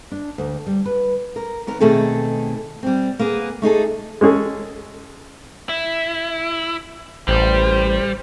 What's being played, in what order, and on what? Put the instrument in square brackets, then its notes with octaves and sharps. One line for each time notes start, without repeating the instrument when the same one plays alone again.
[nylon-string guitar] D4
D2
G3
B4
[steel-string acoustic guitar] A#4
D#2 B3 A#4
B2 D#3 A3 C4 G#4 A4
G3 C4
A#3 B3 G#4
A3 D#4 G#4 A4
[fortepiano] G#3 C#4 G#4 A4
[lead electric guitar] E4
[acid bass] A1 [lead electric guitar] G3 [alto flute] C5